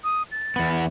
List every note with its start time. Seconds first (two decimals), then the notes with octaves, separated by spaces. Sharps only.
0.04 D#6
0.32 A6
0.56 E2 B3